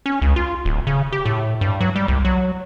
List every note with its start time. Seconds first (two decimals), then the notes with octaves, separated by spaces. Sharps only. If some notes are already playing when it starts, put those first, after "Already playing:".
0.06 C#4
0.22 C#2
0.36 F4
0.65 D1
0.87 C#3
1.12 G4
1.26 A2
1.61 G2
1.81 F#3
1.96 G3
2.08 C2
2.25 F#3